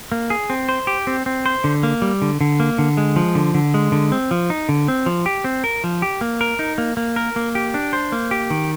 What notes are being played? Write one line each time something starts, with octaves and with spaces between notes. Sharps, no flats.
A#3
G#4
C4
C5
G4
C4
C4
C5
D3
A#3
G3
D3
D3
A#3
D3
G#3
F3
D3
D3
G#3
D3
C4
F3
D#4
D3
C4
F3
G4
C4
A#4
F3
G4
A#3
A#4
D#4
A#3
A#3
A#4
A#3
G4
D4
C5
A#3
G4
D#3